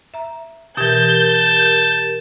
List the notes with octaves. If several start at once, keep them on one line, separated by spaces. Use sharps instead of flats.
E5 A#5
B2 E3 G4 A#4 A5 G6